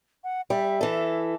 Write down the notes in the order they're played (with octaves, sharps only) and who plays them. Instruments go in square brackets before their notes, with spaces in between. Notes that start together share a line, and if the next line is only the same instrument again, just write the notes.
[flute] F#5
[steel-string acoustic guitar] G3 [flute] E5
[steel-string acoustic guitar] E3 A4